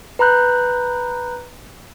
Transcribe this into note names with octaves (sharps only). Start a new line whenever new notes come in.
B4 A#5 B5 F#6 G6